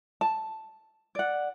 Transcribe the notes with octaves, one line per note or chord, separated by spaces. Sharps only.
A5
D5 F#5